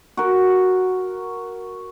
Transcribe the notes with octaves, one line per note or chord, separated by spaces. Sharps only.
F#4 A#4